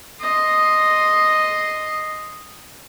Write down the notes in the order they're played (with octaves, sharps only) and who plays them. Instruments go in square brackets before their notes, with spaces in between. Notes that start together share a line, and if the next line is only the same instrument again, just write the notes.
[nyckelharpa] D#5 C6